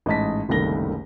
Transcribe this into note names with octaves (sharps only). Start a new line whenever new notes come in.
A1 G#2 D#5 A5 B6
F#1 C2 D#3 A3 A#6 G7